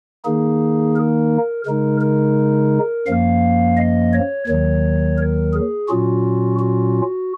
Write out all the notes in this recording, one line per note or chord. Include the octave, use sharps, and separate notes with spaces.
D#3 A#3 D#4 G#4
A#4
C#3 G#3 D#4 A#4
A#4
F#2 F3 A#3 F5
D#5
C#5
D#2 D#3 F#3 C#5
A#4
G#4
A#2 F#3 C#4 F4 F#4
F#4